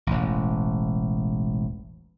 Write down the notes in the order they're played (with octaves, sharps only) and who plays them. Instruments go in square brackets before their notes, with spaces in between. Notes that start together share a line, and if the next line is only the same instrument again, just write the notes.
[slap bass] E1 A1